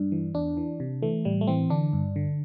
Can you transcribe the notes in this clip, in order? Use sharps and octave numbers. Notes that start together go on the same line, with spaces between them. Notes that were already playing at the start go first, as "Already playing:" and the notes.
Already playing: G2 D4
E3
E2 D4
E3
C3
E3 A3
A2 G3
A3
E3 C4
D3 D4
G2
D3